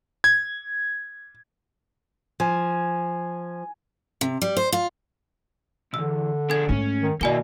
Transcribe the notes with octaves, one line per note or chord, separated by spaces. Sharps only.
G#6
F3 G#5
C3
G3
C5
F4
B1 E2 D3 E6
D4 G#4 A4 G#6
G#2 A3 C#4
D#3
B2 D#3 A#3 E4 D5 G#5 G7